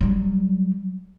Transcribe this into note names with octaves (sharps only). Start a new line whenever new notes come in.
F#3 G3